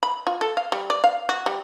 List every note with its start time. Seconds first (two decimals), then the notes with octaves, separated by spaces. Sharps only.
0.03 B5
0.27 F4
0.41 A4
0.57 F5
0.72 G3
0.90 D5
1.04 F5
1.29 F#4
1.46 G3